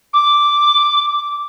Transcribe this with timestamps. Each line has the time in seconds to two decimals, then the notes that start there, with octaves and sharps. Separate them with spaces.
0.14 D6